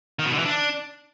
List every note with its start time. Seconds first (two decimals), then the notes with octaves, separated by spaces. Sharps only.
0.19 D#3
0.26 B2
0.32 D3
0.39 E3
0.45 D4